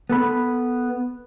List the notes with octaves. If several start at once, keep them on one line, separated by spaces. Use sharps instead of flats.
B3 A4 B5